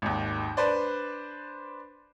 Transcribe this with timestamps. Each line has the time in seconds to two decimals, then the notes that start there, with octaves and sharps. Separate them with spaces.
0.02 G#1 D#2
0.57 D4 B4 C5 D5